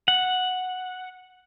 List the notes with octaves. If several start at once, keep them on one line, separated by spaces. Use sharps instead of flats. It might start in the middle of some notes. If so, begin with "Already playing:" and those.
F#5